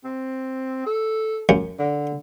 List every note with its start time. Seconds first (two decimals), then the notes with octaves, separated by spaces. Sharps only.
0.05 C4
0.86 A4
1.49 F#2
1.79 D3